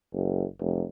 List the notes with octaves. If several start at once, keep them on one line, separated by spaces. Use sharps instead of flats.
F#1
F1